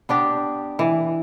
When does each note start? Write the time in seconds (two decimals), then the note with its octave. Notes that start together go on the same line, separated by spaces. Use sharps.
0.09 B3 D4 G4
0.79 E3